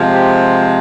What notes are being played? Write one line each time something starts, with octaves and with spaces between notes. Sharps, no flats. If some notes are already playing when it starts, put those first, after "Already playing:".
Already playing: C3 F3 G#3
G4